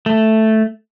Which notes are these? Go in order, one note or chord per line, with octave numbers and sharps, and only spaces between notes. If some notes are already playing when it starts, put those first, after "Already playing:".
A3